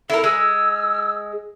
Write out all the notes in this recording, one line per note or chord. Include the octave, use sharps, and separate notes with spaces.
E4 A4 A#4
G#3 E6